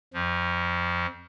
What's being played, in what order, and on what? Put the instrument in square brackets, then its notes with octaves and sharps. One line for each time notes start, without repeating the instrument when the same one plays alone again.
[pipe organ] F2 F3